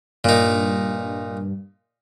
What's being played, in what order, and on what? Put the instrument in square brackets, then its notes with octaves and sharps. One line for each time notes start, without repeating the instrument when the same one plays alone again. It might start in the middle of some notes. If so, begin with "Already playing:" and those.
[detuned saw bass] G2 [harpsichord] A#2 D#4